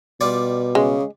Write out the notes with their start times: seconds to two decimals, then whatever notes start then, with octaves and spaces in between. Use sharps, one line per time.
0.21 B2 G3 F4 D5
0.75 C#3 G#3